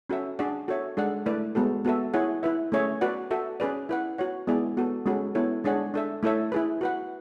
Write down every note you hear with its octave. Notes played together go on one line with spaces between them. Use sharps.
C#4 F#4 A4 E5
D4 G#4 D5 F#5
F#4 A4 C#5 E5
G#3 D4 A4 D5 F#5
A3 E4 B4 D5
G#3 B3 F#4 A4
B3 F#4 A4 E5
E4 G#4 C#5 F#5
E4 B4 E5
A3 C#4 G#4 C#5 E5
F#4 B4 D5 F#5
F#4 A4 E5
C#4 G#4 B4 D5
E4 B4 F#5
F#4 C#5 F#5
G#3 B3 E4 G#4 D5
B3 F#4 A4
G#3 C#4 F#4 A4
B3 E4 A4 C#5
G#3 D4 G#4 C#5 F#5
D4 A4 E5
A3 E4 A4 C#5 E5
E4 G#4 B4
F#4 B4 F#5